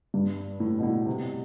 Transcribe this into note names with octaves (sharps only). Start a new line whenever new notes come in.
G2
A2
B2
A2
C3